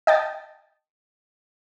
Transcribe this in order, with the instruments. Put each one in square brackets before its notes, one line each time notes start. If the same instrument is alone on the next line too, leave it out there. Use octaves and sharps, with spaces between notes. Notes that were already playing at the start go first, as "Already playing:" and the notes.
[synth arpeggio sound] D#5 G5 A5